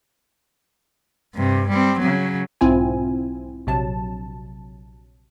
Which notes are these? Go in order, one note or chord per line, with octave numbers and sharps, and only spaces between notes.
G2 C3
G3 C4
C#3 F#3
B1 G#2 C4 E4 F4 G#5
A#1 C3 F#3 A5